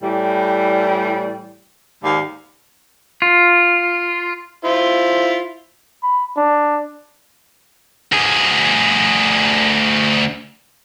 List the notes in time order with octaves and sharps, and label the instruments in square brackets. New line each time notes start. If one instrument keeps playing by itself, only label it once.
[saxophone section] A2 E3 G3
D#2 G#2 D5 F5
[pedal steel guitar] F4
[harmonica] E4 F4 C5
[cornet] B5
D4
[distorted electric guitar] D2 G#4